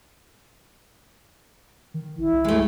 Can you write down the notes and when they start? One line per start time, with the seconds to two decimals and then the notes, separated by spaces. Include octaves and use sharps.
1.94 D#3
2.18 A1 E4
2.32 C2
2.44 G#3 A3